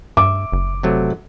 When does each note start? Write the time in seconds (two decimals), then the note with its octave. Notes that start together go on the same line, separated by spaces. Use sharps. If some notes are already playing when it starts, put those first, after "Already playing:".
0.17 G2 E5 D6
0.52 F#1
0.83 C3 F#3 A3